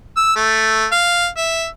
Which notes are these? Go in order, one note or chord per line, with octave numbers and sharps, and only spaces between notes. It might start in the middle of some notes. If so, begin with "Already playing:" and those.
E6
A3
F5
E5